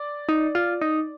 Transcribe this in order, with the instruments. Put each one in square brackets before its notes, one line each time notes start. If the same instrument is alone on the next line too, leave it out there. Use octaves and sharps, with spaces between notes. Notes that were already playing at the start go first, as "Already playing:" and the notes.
Already playing: [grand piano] D5
[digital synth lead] D#4
F4
D#4